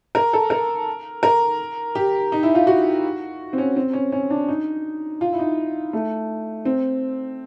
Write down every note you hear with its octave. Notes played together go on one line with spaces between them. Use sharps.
A#4
A4
A#4
A#4
G4
D#4
E4
F4
F#4
C4
C#4
C4
C#4
C#4
D4
D#4
F4
E4
D#4
A3
C4